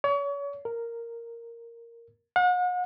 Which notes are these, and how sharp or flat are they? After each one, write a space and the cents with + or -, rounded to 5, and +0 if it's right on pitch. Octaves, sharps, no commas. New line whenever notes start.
C#5 +35
A#4 -5
F#5 -40